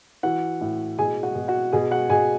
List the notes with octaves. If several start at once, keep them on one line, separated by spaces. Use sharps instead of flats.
E3 F#4 F#5
A2
B2 G#4 G#5
F#4 F#5
B2
F#4 F#5
B2 G#4 G#5
F#4 F#5
B2 G#4 G#5